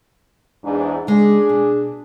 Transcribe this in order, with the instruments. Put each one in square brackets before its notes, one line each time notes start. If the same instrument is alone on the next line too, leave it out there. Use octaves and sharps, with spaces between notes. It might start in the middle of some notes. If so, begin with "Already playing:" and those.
[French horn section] E2 G#2 D4
[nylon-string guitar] C#3 G#3 [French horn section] D4 G#4
[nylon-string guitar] B2